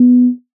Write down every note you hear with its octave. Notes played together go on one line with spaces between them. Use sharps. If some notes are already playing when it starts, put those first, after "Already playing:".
Already playing: B3